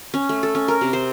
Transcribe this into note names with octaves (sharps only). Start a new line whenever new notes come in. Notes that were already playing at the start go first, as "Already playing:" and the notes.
C#4
A3
A4
C#4
A#4
C3
C5